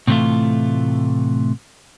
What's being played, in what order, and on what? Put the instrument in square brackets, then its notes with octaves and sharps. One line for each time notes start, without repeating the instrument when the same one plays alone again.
[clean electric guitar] A2 C3 E3 G#3 A3 F4